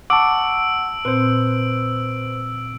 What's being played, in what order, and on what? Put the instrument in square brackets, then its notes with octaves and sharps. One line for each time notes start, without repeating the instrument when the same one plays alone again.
[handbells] F#5 C#6 [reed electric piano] A5 D6 [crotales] E6 D7
[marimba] A#2 C4 [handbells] B4 C5